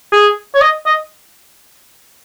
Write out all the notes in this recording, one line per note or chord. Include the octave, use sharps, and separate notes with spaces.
G#4
C#5
D#5
D#5